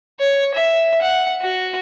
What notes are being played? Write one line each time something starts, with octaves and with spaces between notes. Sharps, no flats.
C#5
E5
F#5
F#4